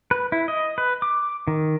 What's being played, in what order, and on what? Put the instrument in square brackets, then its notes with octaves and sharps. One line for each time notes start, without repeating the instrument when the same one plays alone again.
[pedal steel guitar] B4
E4
D#5
B4
D6
D#3